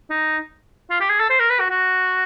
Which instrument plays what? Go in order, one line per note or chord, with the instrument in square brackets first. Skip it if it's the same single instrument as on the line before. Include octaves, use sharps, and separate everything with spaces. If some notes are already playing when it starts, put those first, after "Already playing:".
[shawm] D#4
F4
G4
G#4
A4
C5
A#4
B4
F#4
F#4